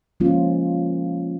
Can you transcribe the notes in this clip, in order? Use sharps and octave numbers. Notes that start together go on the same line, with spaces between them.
F3 G#3 A#3 C#4 F4